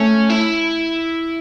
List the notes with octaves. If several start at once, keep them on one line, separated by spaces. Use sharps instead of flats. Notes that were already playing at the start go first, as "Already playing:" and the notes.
Already playing: A3 C#4 A4
E4